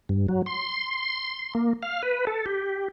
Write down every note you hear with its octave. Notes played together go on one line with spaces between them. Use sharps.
G2
F#3
C6
A#3
F5
B4
A4
G4